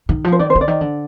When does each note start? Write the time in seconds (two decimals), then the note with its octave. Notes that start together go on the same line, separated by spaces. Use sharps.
0.09 D#3
0.24 F3
0.32 C5
0.39 D#3 D5
0.50 C5
0.55 D3
0.61 D5
0.68 D#3
0.81 D3